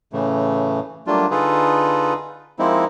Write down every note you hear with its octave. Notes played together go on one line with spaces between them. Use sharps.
A2 C#3 E3 A3
F#3 G3 A3 A#3 D4 F4
D3 D#4 F4 G#4 A4 B4
F3 G#3 A#3 C4 D#4 E4